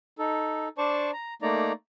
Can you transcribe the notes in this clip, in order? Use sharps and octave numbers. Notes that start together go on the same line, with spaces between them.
D#4 A4
D4 C5 D5 A5 C#6
A#5
A3 A#3 D#4 D5 A#5